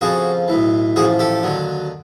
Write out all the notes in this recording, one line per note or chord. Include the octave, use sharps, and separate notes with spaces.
F2 C#3 F3 F#4 G#4
B1 A2 E3
A1 A2 F3 F#4 G#4
G4 A4
D#2 D3 F#3